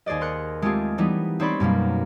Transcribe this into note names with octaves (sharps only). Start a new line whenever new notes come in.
D#2 G#4 C5 D5 D#5
A#4 C6 F#6 C#7
G#3 A3 C4 F4 G4 G#4
E3 G3 B3 D#4
C4 D#4 C#5 D5 B5 C6
F#2 B2 G3 A#3